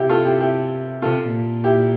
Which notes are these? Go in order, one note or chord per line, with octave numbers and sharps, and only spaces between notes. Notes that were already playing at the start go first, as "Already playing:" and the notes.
Already playing: C3 E4 G4
F4 A4
E4 G4
E4 G4
C3 F4 A4
A#2
E4 G4